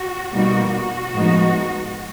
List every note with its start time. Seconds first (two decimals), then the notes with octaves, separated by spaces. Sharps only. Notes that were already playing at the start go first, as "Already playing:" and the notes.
Already playing: F#4
0.33 B2 G3 A#3 D#4 F#4
0.73 F#4
1.12 A2 F3 G#3 B3 D#4